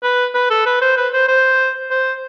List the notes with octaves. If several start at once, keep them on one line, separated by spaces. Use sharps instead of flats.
B4
B4
A4
B4
C5
B4
C5
C5
C5